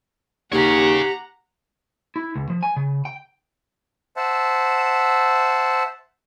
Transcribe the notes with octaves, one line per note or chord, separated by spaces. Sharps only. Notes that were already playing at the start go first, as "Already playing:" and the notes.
D#2 G4 G#4 C#5 F#5 A#5
E4
C#2
F3
G#5
C#3
G5
C5 E5 F#5 A5